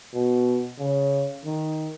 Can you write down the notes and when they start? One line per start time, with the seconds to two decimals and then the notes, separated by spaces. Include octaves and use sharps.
0.14 B2
0.79 C#3
1.45 D#3